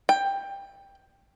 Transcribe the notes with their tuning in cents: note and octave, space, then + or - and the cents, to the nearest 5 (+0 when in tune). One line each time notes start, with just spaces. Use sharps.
G5 +15